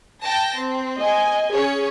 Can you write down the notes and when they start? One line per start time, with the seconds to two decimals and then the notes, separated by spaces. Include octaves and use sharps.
0.22 G5 A5 A#6
0.55 C4
0.99 D#5 G#5
1.52 C#4 G#4 C#5